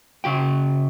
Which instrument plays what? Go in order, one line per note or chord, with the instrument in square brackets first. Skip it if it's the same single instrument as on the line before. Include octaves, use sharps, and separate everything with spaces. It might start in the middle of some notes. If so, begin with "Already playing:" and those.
[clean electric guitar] C#3 F#4 G5